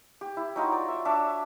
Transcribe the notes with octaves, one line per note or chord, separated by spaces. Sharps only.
G4
E4
F#3 D#4 F4
D5
E5
D4 C#5 E5 D6